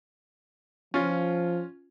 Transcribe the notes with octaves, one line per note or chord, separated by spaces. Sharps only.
F3 C#4 F4